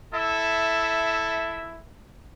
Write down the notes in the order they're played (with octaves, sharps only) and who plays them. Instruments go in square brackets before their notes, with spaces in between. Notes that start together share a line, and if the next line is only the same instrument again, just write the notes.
[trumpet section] E4 A4 E5